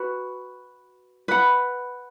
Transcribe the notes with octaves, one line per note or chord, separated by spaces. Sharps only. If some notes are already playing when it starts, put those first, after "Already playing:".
Already playing: F#4 B4
B4 F#5 B5